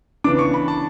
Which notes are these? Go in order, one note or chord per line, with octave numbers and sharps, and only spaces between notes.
C#3 E3 B3 D4 D6
C#6
B5
A5